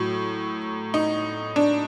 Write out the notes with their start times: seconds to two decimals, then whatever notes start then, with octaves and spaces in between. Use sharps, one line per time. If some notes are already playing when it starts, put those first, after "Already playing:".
Already playing: A2 F#3
0.94 D#4
1.56 D4